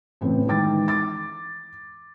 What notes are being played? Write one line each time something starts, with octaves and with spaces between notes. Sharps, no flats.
A2 C#3 E3 B3 C4
D#3 E3 G#3 G5 D6 A6
D6 A6